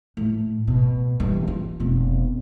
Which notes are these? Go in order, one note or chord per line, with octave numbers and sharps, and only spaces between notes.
A2
B2
G2 E3
F4
F1 B2